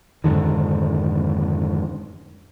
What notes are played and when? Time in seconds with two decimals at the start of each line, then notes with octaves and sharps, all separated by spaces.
0.24 F2 G#2 D3 D#3